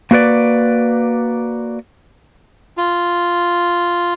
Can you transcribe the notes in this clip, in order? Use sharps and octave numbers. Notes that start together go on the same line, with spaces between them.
A#3 F#4 B4 D5
F4